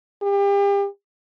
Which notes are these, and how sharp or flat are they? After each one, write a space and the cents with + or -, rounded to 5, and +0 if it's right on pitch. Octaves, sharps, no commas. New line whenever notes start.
G4 +35